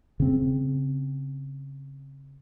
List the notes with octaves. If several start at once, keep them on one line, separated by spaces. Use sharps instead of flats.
C#3 C4